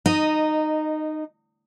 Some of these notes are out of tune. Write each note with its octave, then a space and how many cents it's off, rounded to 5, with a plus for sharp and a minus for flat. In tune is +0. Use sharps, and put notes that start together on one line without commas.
D#4 -15 D#5 +0